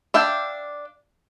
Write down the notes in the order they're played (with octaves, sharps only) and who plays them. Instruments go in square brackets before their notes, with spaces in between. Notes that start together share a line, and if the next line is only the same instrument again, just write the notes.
[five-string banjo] D4 E5 F5 G5